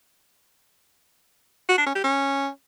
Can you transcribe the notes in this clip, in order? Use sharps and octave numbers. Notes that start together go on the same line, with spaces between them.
F#4
D4
C#4
G4
C#4